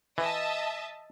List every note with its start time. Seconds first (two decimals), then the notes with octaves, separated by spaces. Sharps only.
0.18 E3 D#5 E5 A5